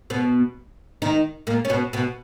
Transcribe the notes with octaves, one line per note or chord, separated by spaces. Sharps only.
B2 B3
D#3 D#4
A#2 A#3
C#4
B2 B3
B2 B3